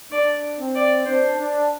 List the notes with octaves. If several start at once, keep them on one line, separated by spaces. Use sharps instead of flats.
D4 D5
C4
D5
D4 C5
D4